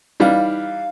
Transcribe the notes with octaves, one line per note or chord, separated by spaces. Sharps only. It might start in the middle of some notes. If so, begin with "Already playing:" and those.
E3 G3 D#4 F5